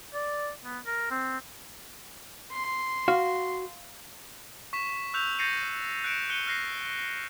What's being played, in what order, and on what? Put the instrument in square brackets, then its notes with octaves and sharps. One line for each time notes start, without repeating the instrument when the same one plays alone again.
[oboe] D5
B3
A#4
C4
[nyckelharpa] C6
[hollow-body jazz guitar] F#4 [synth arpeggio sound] F5
[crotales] C#6 B6 E7
C#6 E6 F#6 G6 F7
G6 A6 A#6 C7 C#7 D#7
F#6 A#6 C#7 D7 E7
F#6 C#7 D#7 G7
F6 F#6 A#6 C7